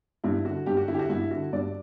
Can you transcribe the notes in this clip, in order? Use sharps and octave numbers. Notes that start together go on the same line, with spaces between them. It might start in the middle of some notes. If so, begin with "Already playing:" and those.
G2 E4
D3 F#4
G2 G4
F#4
D3 E4
G4
F#4
G2 E4
D3 F#4
G2 D5